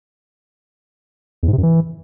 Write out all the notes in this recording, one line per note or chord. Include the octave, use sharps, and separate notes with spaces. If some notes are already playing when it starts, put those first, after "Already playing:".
E2
G#2
C3
F#2
E3